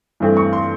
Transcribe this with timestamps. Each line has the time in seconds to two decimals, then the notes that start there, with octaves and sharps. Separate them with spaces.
0.20 G2 E3 A3 C4
0.37 C#6
0.53 C6